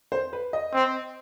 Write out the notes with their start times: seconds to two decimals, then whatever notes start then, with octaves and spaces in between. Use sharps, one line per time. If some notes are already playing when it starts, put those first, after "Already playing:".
0.12 C5
0.33 B4
0.53 D#5
0.74 C4